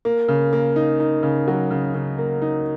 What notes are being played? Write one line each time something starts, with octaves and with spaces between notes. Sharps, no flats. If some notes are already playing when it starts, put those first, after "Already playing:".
A#3
C#3
A#3
D#4
D#4
C#3
F#3
C#3
C#3
A#3
D#4